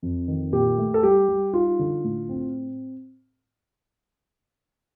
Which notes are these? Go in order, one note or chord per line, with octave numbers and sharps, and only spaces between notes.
F2
D#3
A#2 G4
A3
A4
G3 G4
G3
D#4 F4
D3
A2
C4